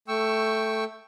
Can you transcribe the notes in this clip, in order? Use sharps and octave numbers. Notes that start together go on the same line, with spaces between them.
A3 G5 C#6 E6